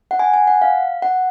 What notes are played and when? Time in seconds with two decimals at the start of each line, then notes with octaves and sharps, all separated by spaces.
0.11 F#5
0.19 G#5
0.34 G#5
0.47 F#5
0.62 F5
1.02 F#5